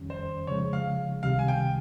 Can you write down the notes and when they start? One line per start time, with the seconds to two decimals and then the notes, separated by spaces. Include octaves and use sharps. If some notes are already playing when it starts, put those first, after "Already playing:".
Already playing: F2 D#3 G3 C#4
0.10 C5
0.47 C#3 F3 G#3 C#5
0.73 F5
1.23 C#2 C3 D#3 G3 F5
1.39 G#5
1.48 G5